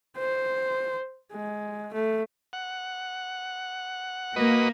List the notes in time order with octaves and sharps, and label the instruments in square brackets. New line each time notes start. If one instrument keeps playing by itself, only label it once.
[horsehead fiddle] C5
G#3
A3
[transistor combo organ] F#5
[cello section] A#3 [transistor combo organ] F#4 B4 D#5